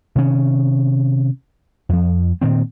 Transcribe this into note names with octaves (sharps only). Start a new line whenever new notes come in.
C3 D#3 C#4
F2 F3
A#2 D#3 C4